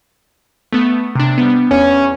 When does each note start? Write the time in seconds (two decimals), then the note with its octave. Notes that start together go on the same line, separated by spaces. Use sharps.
0.73 A3 B3
1.15 C3 D4
1.38 G3 B3
1.71 E2 C#4